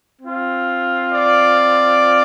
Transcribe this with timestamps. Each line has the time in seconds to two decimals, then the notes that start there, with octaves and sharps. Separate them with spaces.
0.22 C4 F4
1.12 D5